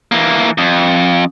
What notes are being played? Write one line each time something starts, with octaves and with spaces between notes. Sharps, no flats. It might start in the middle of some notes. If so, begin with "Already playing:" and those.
E3 A#3
F2